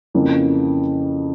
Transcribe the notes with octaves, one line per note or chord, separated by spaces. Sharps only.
F2 C#3 E3 A#3